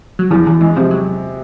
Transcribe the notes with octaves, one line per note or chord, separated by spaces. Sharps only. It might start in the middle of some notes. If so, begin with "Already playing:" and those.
F#3
E2 F3
E2 E3
E3 G#3
C3 F3
F#3